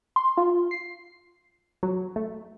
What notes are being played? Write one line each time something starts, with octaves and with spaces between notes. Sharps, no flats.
C6
F4
C7
F#3
A3